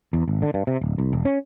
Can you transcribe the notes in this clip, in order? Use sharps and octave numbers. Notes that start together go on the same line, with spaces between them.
E2
G#1
D3
G2
C3
D1
C2
E1
C#4